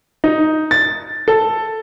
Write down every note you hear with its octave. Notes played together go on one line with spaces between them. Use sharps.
D#4
A6
A4